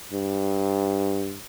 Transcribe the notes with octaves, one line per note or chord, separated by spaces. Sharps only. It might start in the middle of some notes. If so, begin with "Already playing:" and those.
G2